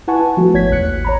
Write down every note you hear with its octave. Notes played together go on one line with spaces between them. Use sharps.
E4 B4 F#5 G#5 A5 C#6
F3 A3 B3 F#4
G#1 C#5 G#6 B6
A1 D#2 F#6 C#7
C#5 A#5 B5